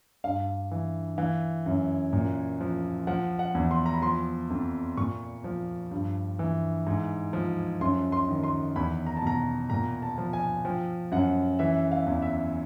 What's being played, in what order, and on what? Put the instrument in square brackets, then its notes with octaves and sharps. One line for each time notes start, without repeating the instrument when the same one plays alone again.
[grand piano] G2 F5
E3
E3 F5
F#2
A#2
F3
F3 F#5
F#5
E2
C6
A#5
B5
F3 C6
F2
A#2 C#6
F3
G2
E3
G#2
F3
F#2 C6
C6
D#3
C6
E2 B5
A#5
A5
B2 A#5
A#2 A#5
A5
F3
G#5
F3 G5
F#2 F#5
E3 E5
F5
E2
E5